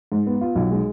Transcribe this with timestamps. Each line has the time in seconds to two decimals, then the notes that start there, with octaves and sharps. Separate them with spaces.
0.12 G#2
0.26 B3
0.41 F4
0.56 B1
0.71 G#3